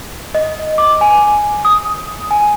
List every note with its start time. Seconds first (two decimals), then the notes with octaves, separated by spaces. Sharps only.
0.35 D#5
0.78 D6
1.01 G#5
1.65 D#6
2.31 G#5